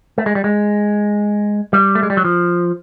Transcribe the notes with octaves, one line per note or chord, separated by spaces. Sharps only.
A3
G#3
G3
G#3
G3
A3
G#3
G3
F#3
F3